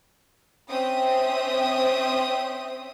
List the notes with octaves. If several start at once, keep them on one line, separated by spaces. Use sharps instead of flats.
C4 C#4 C5 E5 G5 D#6